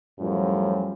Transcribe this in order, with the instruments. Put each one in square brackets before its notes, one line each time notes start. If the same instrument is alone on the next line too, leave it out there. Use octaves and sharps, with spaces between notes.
[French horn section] F#2 A2 F3 G3